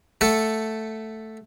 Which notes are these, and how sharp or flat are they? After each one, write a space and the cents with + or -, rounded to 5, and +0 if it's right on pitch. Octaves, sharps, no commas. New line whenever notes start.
A3 +0 A4 +0 F#5 -5